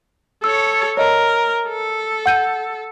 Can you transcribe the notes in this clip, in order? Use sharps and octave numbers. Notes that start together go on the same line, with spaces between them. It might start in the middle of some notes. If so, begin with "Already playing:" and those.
A4 C#5 E6
A#4 C#5 D#5
A4
F#5 G6 D#7